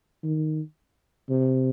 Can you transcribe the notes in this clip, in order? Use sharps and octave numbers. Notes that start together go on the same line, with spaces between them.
D#3
C3